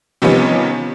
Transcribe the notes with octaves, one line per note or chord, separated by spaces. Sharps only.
C3 D#3 F3 G3 B3 C#4